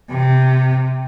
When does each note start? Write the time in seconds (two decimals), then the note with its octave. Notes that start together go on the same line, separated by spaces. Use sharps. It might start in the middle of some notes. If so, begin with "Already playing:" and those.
0.11 C3